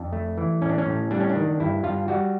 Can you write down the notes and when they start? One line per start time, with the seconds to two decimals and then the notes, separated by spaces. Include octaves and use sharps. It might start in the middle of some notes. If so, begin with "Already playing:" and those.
Already playing: F2 D4
0.13 A3
0.38 E3
0.62 A2 C#4
0.69 D4
0.78 C#4
0.86 A2
1.11 G3 D4
1.20 C#4
1.29 D4
1.36 D#3
1.60 G2 E4
1.84 G2 F4
2.08 G3 F#4